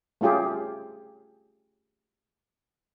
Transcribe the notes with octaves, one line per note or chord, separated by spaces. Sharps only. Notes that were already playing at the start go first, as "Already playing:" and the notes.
A3 C#4 F4 G4 G#4